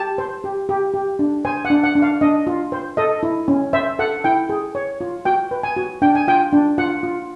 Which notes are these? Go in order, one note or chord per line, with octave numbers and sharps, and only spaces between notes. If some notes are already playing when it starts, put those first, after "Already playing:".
Already playing: G4 A5
C5
G4
G4
G4
D4
C5 G#5
F#5
D4
F#5
D4
F5
D4 D#5
F4
C5
A4 D#5
E4
C#4
C5 E5
A4 F#5
E4 G5
G#4
C#5
F4
F#4 G5
B4
G#5
F#4
D4 G5
G#5
F4 G5
D4
F4 F#5
F4